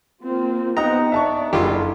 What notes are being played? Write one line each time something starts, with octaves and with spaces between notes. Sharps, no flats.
A#3 C4 F4
B3 C4 D#4 G4 F#5 G5 A#5
D4 D5 E5 A5 C#6
F#1 D4 E4 F4 G4 A4 C6